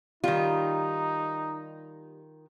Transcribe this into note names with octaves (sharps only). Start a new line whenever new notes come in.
D#3 G3 D#4 F4